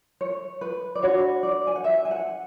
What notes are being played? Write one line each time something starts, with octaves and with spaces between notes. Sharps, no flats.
C#5
B4
D5
D4 F#4 B4 C#5
D5
G#5
F#5
E5
G#5
F#5